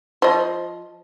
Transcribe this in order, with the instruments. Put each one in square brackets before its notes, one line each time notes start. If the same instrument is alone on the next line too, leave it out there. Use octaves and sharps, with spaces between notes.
[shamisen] F3 D#5